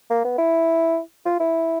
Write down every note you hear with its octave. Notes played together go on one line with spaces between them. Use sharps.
A#3
B3
E4
F4
E4